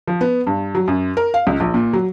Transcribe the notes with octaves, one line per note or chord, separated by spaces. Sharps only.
F3
B3
G2
F#3
F#2
A#4
F5
C#2
A#1
A#2
F#3